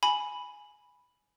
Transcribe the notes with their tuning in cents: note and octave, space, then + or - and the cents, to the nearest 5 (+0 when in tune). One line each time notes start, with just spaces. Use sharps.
G#5 +5 B5 +0